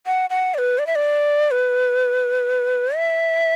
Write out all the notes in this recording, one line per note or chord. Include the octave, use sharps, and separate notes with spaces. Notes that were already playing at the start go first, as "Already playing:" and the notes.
F#5
F#5
D5
B4
D5
E5
D5
B4
E5